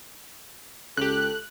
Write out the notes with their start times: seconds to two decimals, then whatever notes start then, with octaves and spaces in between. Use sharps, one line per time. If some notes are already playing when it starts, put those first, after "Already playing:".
0.97 C#2 G4 A4 F#6